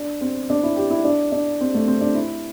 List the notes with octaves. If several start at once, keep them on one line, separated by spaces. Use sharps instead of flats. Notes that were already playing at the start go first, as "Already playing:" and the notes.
Already playing: D4
C4
D4
E4
G4
E4
D4
D4
C4
A3
C4
D4
E4